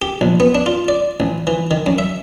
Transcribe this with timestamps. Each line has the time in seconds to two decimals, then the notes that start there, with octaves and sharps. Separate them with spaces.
0.02 G4
0.21 A#1
0.40 B3
0.55 D4
0.66 F4
0.88 D5
1.20 A1
1.47 E3
1.71 D#3
1.86 F#2
1.98 E5